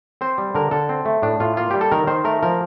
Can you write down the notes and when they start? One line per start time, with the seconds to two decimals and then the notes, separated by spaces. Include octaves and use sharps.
0.21 C4 C5
0.38 G3
0.55 D3 A#4
0.71 D3 A4
0.89 C4
1.05 A3
1.22 A2 D4
1.40 A2 F4
1.57 A#3 F4
1.71 G3 G4
1.81 A4
1.92 D#3 A#4
2.07 D#3 C5
2.24 A3 A#4
2.43 F3 A#4